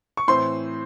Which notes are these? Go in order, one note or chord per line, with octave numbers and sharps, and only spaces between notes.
C#6
A2 E3 C4 C6